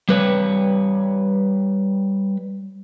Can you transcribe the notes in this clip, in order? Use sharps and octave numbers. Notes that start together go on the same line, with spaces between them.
G3 B4 C#5